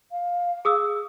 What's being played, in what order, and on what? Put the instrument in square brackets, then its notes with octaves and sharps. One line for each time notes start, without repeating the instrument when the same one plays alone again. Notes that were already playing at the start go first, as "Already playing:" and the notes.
[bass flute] F5
[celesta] G#4 D#6 E6